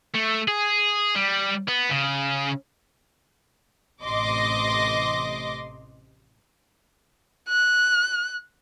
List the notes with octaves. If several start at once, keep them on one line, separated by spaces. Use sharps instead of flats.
A3
G#4
G3
B3
C#3
A1 C3 D#5 C6 D6 A#6
F#6